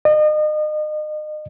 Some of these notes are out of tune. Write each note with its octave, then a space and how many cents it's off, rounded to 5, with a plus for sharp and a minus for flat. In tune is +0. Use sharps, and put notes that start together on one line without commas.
D#5 -35